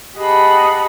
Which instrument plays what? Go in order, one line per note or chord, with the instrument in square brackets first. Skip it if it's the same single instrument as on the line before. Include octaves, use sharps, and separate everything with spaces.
[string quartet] G4 G#4 D#5 F#5 A5 B5